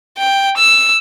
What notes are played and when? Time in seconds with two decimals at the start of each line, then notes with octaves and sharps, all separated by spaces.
0.18 G5
0.57 E6